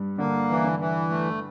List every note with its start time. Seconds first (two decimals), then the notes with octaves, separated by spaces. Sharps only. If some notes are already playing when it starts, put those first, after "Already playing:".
Already playing: G2 G3
0.18 D3 A#3 D4
0.49 E3
0.64 D3 D4
0.79 E3
1.10 A3